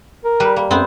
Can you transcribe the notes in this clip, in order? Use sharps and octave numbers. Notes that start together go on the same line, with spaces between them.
A#4
G3 B4
A#3
F#2 B3 C4